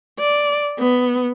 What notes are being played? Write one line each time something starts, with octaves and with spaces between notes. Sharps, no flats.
D5
B3